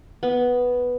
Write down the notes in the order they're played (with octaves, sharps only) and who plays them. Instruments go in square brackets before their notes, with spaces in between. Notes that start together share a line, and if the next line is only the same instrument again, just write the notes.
[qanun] B3